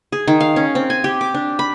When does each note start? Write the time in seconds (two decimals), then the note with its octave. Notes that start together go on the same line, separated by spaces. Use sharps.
0.12 G#4
0.27 D#3
0.40 F5
0.56 C#4
0.75 C4
0.90 G#5
1.04 G4
1.21 D6
1.34 D4
1.59 B5